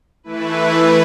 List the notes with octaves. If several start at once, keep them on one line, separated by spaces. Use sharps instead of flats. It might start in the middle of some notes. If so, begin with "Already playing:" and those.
E3 A3 E4 B4